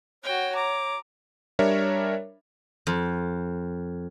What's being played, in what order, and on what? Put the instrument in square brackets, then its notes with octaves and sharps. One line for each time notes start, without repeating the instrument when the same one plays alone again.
[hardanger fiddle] F#4 G5 [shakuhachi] C#5
[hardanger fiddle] A#5 [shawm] D6
[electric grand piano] G3 D4 A#4 C#5 E5
[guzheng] F2